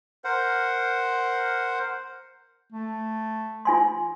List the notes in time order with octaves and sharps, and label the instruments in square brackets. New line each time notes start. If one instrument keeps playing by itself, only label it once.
[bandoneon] A#4 C5 F#5
[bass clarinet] A3
[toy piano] F4 G#5 C6